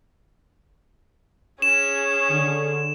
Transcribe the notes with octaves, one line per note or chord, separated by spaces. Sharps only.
C#4 G#4 E7
D3